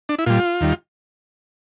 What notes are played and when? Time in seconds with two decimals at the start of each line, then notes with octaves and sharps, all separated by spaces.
0.09 D4
0.19 E4
0.26 A#2 G3 F4
0.61 D#2 D#3 G3